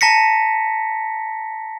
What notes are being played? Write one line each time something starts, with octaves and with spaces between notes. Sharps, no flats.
A5 A#5 A#6 B6 C#7